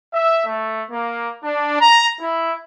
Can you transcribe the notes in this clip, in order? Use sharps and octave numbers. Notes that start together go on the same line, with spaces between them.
E5
A3
A#3
D4
A#5
E4